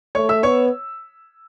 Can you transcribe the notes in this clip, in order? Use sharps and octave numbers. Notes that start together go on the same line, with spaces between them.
A3 C#5 C#6
E5 E6
B3 C#5 C#6